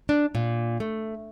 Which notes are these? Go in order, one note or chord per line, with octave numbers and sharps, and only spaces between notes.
D4
A#2
A3